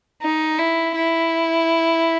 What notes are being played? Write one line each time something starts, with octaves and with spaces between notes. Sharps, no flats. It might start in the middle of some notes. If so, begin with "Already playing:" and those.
D#4
E4
E4